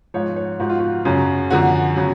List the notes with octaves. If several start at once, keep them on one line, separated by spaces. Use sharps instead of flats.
G#2 F3 C#5
C#5
G#2 F3 F#4
F4
F#4
F#2 C#3 F#3
F#2 D3 F3 F#4
C#3 F#3